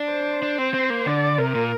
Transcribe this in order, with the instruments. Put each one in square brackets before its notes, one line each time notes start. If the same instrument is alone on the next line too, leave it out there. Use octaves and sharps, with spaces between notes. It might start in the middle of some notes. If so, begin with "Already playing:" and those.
Already playing: [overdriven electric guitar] D4
[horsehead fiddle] C5
[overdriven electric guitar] D4
C4
C4
A#3
[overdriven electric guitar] D3 [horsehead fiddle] D5
[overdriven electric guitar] C3 [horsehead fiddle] A#4
[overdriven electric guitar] A#2